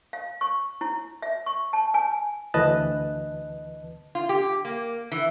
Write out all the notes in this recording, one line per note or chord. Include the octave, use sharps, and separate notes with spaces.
F5
C#6
E4
E5
C#6
A5
G#5
D2 E3 B4 D#5 A5 F#6
F4
G4
A#3
E3